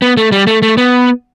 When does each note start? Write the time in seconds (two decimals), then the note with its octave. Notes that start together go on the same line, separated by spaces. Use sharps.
0.02 B3
0.17 A3
0.32 G3
0.47 A3
0.62 A3
0.77 B3